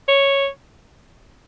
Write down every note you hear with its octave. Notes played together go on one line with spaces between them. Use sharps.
C#5